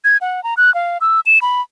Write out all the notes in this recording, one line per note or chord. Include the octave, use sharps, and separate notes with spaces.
G#6
F#5
A#5
F#6
F5
E6
E7
B5